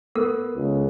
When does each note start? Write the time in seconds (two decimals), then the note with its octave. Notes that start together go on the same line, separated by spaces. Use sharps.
0.15 B3 A4 A#4
0.56 C#2